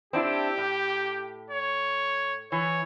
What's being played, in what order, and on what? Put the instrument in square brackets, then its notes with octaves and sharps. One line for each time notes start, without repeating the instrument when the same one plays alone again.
[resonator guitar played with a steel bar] C4 D4 E4 [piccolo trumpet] G4
[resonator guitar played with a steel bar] A2
[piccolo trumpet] C#5
[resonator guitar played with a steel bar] E3 [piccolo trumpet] C#5